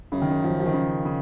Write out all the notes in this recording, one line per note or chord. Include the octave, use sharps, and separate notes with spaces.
F#2 C#3
D#3
C#3
F3
F3
D#3
C#3
C#3